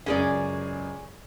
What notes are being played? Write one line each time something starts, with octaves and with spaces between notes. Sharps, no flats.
C#2 F#2 C#4 G#4 D5